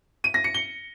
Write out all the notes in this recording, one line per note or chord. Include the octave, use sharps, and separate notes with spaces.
D#7
A#6
C#7
G7